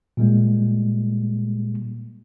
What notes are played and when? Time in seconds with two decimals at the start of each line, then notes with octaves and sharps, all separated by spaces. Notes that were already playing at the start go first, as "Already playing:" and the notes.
0.17 A#2 G3 G#3 A#3